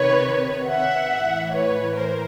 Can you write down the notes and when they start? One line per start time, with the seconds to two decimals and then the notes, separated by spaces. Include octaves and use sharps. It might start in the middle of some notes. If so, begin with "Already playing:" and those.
Already playing: C3 D#3 B4 C#5
0.68 E5 F#5
1.11 A2 E3
1.53 B4 C#5
1.96 A#4 C5